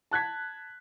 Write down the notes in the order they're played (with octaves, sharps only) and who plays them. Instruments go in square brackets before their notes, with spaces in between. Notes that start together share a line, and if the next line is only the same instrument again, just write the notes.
[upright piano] A5 F#6 G#6 B6